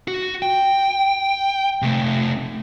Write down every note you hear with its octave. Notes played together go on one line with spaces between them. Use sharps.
F#4
G5
C3 A3